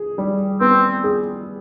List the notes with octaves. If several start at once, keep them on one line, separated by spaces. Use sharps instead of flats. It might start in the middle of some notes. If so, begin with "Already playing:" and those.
Already playing: G#4
G3
B3 C4
G#4